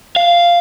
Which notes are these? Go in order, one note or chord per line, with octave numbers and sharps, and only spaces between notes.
F5